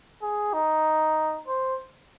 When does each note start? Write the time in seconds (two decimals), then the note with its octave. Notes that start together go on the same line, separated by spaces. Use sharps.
0.22 G#4
0.53 D#4
1.48 C5